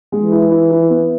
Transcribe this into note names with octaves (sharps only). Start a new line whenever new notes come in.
G#3
E3
E4
E4
E4
B3